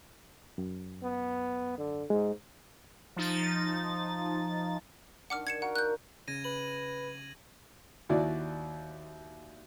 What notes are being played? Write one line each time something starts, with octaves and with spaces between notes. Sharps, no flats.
F#2
B3
D3
G#2 G#3
F3 D#4 A6
D#3 D4 F#5 D6 F6
G#6 C#7 E7
F#4 A#4 F5 F#5
F#6 G6
C#3 G#6 A#6 D#7
B4 F#7
D#2 E4 F#4 D5